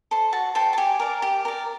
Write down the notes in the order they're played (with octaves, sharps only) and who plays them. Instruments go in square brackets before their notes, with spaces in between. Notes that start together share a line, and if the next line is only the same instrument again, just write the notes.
[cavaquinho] A4 C5
F#4 A5
A4 C5 G5
A5
G4 G#5
A#4 D5
G4
A#4 D5